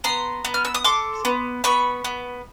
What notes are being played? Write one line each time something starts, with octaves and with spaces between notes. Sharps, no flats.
B3 A#5 C6
B3
F6
E6
D#6
A4 C6 D6
B3
B3 B5 C#6
B3